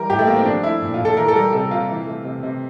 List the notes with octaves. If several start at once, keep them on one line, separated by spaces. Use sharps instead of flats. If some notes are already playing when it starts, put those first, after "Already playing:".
Already playing: E3 G3 A#4
A2 G4
A3
A2 A#3
C4
F3 D4
A3 E4
A#2
F4
A#2
A4
E3 A#4
A4
G3 A#4
C3 A4
C3 F4
E3
A3
C3
C3